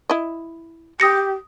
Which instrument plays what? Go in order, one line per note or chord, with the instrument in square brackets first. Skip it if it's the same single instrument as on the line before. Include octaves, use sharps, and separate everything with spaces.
[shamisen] E4 D#5
[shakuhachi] G4 [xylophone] D#6 A#6 C#7